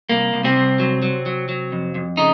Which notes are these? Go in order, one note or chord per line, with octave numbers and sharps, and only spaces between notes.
C2 A#3
C2
C3 C4
C2
F#3
F#3
F#3
F#3
F2
F2
C#3 D#4